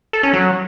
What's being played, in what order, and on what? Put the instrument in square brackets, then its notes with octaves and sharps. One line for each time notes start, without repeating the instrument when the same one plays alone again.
[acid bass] A4
C#4
F#3